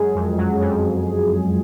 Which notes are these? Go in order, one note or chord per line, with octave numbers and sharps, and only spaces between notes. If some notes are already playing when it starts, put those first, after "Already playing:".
Already playing: F#2 G#3 G#4
F2
F#3
F2